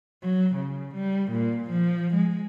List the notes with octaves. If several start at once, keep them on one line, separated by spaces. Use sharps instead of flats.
F#3
C#3
G3
A#2
F3
G#3